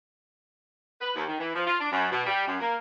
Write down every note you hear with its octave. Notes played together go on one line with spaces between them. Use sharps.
B4
D#2
D#3
E3
F3
F4
D4
F#2
B2
G3
F#2
A#3